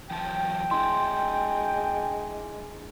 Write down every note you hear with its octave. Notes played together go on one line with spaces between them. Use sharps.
E3 F#3 G5 A5
G#3 D4 E4 C6